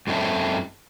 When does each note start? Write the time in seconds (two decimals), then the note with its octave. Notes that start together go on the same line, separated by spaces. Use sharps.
0.07 F#2 G#3 C4 E4 A4